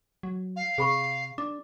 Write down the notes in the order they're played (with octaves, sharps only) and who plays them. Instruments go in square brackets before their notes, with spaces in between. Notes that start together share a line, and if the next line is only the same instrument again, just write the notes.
[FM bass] F#3
[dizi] F5
[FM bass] C3 [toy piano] G#4 B5 C#6
[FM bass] D4 [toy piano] D6